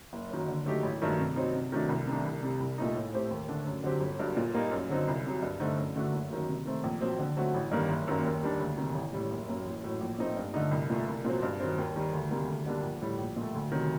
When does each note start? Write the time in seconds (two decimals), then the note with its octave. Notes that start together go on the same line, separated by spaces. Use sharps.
0.13 F#1
0.30 F#2 D#3 F#3
0.48 D3
0.66 F#3 A3 D#4 G4
0.83 A1
1.01 G2 D#3 F#3 A3
1.19 C3
1.36 F#3 C4 D#4
1.54 C3
1.72 D#3 F#3 A3 D4
1.89 C2
2.07 C3 D#3 A3 D4
2.25 C2
2.43 C3 G3
2.60 C2
2.78 A#2 A3 D#4
2.95 A2
3.13 A3 C4 G4 C5
3.30 D#2
3.48 D3 A3 D4
3.66 F#2
3.83 D3 F#3 C4 G4
4.01 G1
4.19 G2 F#3
4.37 A#2
4.54 G3 A#3 D#4
4.71 F#2
4.89 D3 F#3 C4 D#4
5.08 C2
5.25 C3 F#3
5.42 G2
5.60 D3 A3 C4 D#4
5.78 F#2
5.96 D3 A3 D4 F#4
6.13 F#1
6.30 F#2 D#3 F#3
6.48 C3
6.66 D#3 A3 C4
6.84 A#1
7.01 A#2 F#3 C4
7.19 D3
7.37 F#3 A3 C4 F#4
7.54 A1
7.71 G2 D#3 G3 A#3
7.89 F#1
8.08 F#2 D#3 F#3 A#3
8.24 D#2
8.43 D#3 G3 D4
8.60 D2
8.77 C3 D#3
8.95 A1
9.13 A2 G3
9.31 F#1
9.48 F#2 F#3 A#3
9.65 A1
9.84 A2 F#3
10.01 A#1
10.18 A#2 A3 C4 D#4
10.37 G2
10.54 D3 A3 D#4
10.71 C2
10.90 A#2 A3
11.08 C2
11.25 A#2 F#3 C4
11.43 G2
11.60 D#3 F#3 C4
11.78 D#2
11.96 D#3 G3
12.13 D2
12.30 C3 D#3 G3 A#3
12.48 D2
12.66 D3 G3 A#3 D4
12.83 A#1
13.01 A2 G3
13.18 A#1
13.36 A#2
13.41 A3
13.55 D2
13.72 C3 D#3 F#3